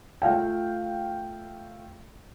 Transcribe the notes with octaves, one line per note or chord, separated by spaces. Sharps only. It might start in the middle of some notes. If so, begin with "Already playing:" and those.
A3 F4 F5 G5